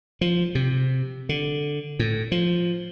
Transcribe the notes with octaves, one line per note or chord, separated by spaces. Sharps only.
F3
C3
D3
A2
F3